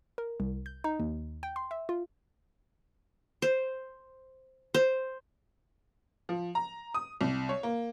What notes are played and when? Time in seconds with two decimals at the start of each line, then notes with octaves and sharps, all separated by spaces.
0.18 A#4
0.40 C2
0.66 G6
0.84 D#4
1.00 D#2
1.43 G5
1.56 C6
1.71 E5
1.89 F4
3.42 C5
4.74 C5
6.29 F3
6.55 A#5
6.94 D#6
7.21 C2
7.49 C#5
7.63 A#3